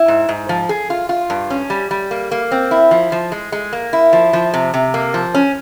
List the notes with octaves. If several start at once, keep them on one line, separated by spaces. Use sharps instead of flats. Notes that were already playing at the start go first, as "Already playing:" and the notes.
Already playing: E4
G#2
G#2
F3
G#4
F4
F4
G2
C#4
G3
G3
A#3
A#3
C4
E4
F3
F3
G#3
G#3
A#3
E4
F3
F3
C3
C3
A#3
F3
C#4